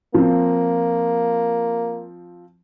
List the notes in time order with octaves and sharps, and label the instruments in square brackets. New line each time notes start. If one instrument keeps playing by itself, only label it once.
[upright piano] F3 C4 [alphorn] A#3